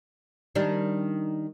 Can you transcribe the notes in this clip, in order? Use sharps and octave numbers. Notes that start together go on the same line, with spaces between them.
D#3 G3 D4